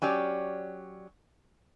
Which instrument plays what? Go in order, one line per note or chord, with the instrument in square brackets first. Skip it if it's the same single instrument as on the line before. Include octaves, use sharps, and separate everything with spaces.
[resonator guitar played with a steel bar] F#3 C#4 G4 D5